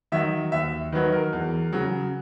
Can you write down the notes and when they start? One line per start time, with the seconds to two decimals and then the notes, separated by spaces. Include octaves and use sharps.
0.12 D#3 F#3 E5
0.52 D#2 E5
0.92 D#3 F#3 B4
1.13 A#4
1.33 E2
1.72 C#3 F#3